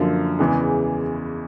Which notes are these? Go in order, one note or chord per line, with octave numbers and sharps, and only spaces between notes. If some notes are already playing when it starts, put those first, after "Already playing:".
Already playing: F#2 D3 F3 A#3
E2 C#3 E3 G#3